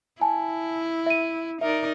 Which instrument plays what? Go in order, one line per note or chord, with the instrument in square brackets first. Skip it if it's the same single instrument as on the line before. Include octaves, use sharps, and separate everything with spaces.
[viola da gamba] E4 [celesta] G#5 A5
[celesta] E5 D#7
[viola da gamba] D#4 A#4 D5 [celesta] E5